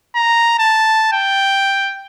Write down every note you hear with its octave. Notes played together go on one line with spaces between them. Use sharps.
A#5
A5
G5